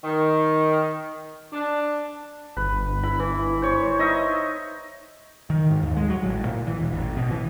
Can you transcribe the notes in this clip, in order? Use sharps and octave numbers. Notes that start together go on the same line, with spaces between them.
D#3
D4
G1 B4
E4 B5
E3
C5 C#5
D#4 D#5 E5
D#3
G#2
D#2
G#3
F#3
A1
A#2
E3
E1
A1
B2
E3